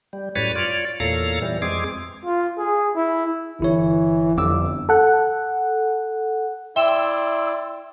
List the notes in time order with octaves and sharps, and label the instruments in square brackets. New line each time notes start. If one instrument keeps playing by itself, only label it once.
[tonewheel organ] G3
F#2 A2 G3 B4 C#5 A6
F4 C#5 D5
E2 A#2 A4 C#5 F5 A#5
E3 G3
F2 G#3 C4 G#4 D6
[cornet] F4
G#4
E4
[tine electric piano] G1 E4 C#5 [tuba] E3
[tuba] G1 [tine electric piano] F2 D6 E6
[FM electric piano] A4 F#5
[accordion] E4 D5 [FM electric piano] E5 [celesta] G5 E7 [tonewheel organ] C6 E6